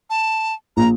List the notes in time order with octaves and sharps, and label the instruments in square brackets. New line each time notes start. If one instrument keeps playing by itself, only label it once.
[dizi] A5
[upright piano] A#1 [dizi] A#5